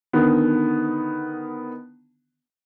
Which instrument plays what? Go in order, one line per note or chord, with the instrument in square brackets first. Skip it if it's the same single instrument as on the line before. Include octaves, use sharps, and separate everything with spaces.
[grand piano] D3 D#3 B3